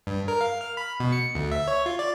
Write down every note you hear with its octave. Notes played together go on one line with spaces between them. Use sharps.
G2
A#4
F5
F6
B5
B2
C#7
D2
E5
C#5
F4
D5